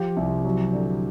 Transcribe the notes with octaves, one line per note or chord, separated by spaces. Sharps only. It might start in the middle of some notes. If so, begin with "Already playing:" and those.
Already playing: F3 G4
C2
F#3
D3